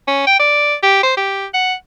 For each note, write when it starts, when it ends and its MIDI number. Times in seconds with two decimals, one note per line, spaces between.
0.08 0.23 61
0.27 0.39 79
0.39 0.75 74
0.83 1.01 67
1.03 1.16 72
1.17 1.46 67
1.54 1.74 78